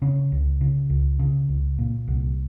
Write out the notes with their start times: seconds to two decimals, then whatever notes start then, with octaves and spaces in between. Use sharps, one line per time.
0.02 C#3 C#4
0.32 C#2
0.61 C#3
0.89 C#2
1.19 C#3
1.49 C#2
1.79 A#2
2.08 C2